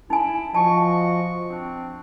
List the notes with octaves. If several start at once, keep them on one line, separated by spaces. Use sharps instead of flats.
D#4 E4 G#5
F3 F#4 D#5 A5 C#6
C4 D4